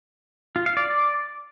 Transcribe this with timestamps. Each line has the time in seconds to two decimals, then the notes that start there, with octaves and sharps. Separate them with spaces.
0.56 F4
0.66 F5
0.77 D5